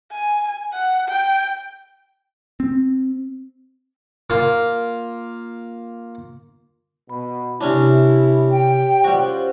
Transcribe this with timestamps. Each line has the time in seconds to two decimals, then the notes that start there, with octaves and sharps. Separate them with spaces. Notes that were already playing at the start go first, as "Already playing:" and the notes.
0.12 G#5
0.73 F#5
1.09 G5
2.60 C4
4.30 A#3 F4
7.10 B2 B5
7.61 C3 C#4 D4 E4 G4 C#5
8.51 G5
9.04 G3 C#4 F4 F#4 C5